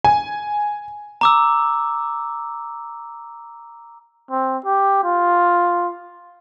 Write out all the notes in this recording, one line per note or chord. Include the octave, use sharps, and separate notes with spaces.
G#5
A#5 D6 E6
C4
G4
F4